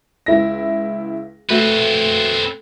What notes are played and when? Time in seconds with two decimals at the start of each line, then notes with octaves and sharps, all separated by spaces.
0.26 C#2 E4 A#6
1.50 A3 C4 F#4 A4 B4